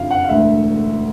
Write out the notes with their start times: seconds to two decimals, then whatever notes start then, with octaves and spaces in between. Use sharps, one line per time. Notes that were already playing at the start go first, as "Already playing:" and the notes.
Already playing: F#1 F2 D3 F3 F5
0.11 F#5
0.24 F5
0.29 E1 D2 D3 E5